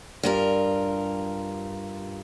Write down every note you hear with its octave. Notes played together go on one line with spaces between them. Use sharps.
G2 F4 A#4